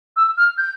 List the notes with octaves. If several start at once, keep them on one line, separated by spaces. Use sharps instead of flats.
E6
F6
G6